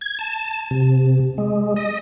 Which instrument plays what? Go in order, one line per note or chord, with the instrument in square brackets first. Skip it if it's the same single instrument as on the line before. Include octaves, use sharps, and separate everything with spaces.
[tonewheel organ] G#6
A5
C3
G#3
D#5